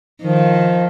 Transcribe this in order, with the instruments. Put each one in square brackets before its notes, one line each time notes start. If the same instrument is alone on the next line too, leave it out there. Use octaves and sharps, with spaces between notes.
[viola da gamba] D#3 [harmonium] F3